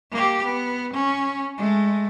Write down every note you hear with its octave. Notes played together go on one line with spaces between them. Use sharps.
A#3 G4
B3
C#4
G#3 A3